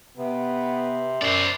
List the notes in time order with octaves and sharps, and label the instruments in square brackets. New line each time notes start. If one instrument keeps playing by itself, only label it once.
[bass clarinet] C3 [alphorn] B3
[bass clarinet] F#2 [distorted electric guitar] C5 D5